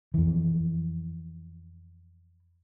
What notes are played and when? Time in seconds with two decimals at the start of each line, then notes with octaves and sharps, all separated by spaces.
0.14 F2 E3